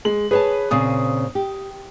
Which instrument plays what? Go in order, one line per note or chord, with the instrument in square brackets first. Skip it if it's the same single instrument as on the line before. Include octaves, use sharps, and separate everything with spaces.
[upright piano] G#3 F#7
[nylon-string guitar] G#4 C#5 A5 [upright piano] B4
[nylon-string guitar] A#2 C#3 C4 [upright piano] D#6
[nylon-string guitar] G4